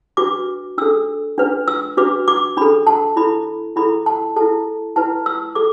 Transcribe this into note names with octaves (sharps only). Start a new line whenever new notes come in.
D4 F#4 B4 D6
D4 A4 E6
D4 B4
E6
D4 F#4 B4 D6
D6
D4 A4 B5
A5
E4 A4 B5
E4 A4 B5
A5
E4 A4 A5
E4 B4 A5
E6
A4 D6